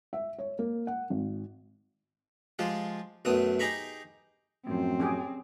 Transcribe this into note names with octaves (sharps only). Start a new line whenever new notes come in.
E5
C#5
A#3
F#5
G#1
F3 G#3 F4 G4
B1 F#2 A3 B3 D#6
D#4 G4 G#4 A#5 B5 C#6
F#2 A2 F3 C4
C#4 G4 G#4